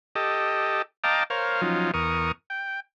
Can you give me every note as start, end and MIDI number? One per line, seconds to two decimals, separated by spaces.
0.15 0.82 67
0.15 0.82 69
0.15 0.82 75
1.04 1.24 75
1.04 1.24 77
1.04 1.24 79
1.04 1.24 81
1.04 1.24 82
1.04 1.24 86
1.30 1.61 70
1.30 1.61 72
1.30 1.61 73
1.30 1.61 77
1.62 1.91 53
1.62 1.91 54
1.62 1.91 61
1.62 1.91 63
1.62 1.91 65
1.94 2.32 40
1.94 2.32 70
1.94 2.32 85
1.94 2.32 87
2.50 2.80 79